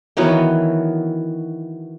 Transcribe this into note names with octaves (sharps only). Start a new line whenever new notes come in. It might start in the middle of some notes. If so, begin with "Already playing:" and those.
D#3 E3 F#3 B3